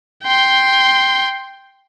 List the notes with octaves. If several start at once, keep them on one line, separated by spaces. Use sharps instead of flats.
G5 C6